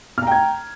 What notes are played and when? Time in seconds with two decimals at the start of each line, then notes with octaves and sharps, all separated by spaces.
0.18 F6
0.22 A#5
0.27 G5
0.32 G#6